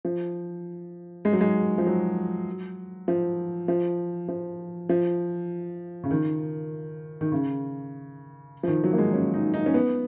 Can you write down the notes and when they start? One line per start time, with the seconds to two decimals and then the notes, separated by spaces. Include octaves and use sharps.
0.05 F3
1.25 G#3
1.33 F#3
1.41 G#3
1.78 F3
1.87 F#3
3.08 F3
3.68 F3
4.28 F3
4.89 F3
6.04 C#3
6.11 D#3
7.21 D#3
7.32 C#3
8.63 F3
8.68 D#3
8.84 F#3
8.93 A#3
8.98 G#3
9.14 C#4
9.34 D#4
9.54 D#4
9.66 C#4
9.74 B3